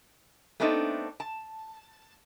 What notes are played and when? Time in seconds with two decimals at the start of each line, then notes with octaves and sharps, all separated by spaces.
0.60 A3 B3 C4 D4 D#4 A4
1.20 A5